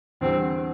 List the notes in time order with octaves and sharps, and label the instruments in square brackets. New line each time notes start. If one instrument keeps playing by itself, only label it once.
[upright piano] E2 D3 G3 [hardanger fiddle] C4